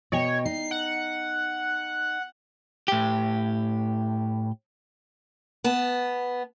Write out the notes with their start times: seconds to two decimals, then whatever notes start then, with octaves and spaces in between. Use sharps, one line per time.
0.12 B2 C#5 D#5 G5
0.45 D#4 C7
0.71 F#5
2.88 A2 G4
5.64 B3 A5